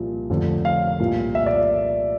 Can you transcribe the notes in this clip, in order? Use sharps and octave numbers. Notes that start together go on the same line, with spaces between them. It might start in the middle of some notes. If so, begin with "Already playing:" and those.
Already playing: C2 A#2 F3
F1 F2 D3 F3
F5
C2 A#2 F3
E5
D5